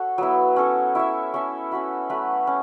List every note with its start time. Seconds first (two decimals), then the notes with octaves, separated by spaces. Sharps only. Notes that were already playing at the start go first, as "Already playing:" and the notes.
Already playing: F#4 A4 C#5 E5
0.18 F#3 B3 E4
0.56 C#4 A4 C#5
0.95 E4 C#5 E5
1.34 C#4 A4 E5
1.71 C#4 F#4 B4 E5
2.09 F#3 A3 E4 B4
2.47 C#4